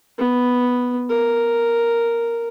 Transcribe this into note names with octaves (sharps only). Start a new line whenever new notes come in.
B3
A#4